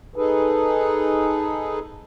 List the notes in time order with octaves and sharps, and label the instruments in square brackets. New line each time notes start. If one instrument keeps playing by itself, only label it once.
[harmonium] D#4 G#4 A4 B4